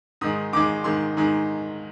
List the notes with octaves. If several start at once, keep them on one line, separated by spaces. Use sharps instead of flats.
G#2 D#3 G#3 D#6
G#2 D#3 G#3 D6
G#2 D#3 G#3 C6
G#2 D#3 G#3